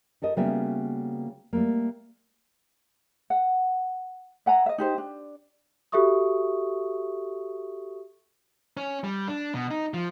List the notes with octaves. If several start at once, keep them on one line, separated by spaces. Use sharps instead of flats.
G4 A4 A#4 D#5
C#3 G3 A#3 B3 F#4 E5
G3 A3 A#3
F#5
E5 F#5 G#5 A#5
D#5 E5
D#4 G4 C5
D4
F#4 G4 A4 E5 C#6 D#6
C#4
G3
D4
B2
D#4
F3